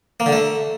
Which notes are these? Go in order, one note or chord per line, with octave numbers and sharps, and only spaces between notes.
A#3
D3
A3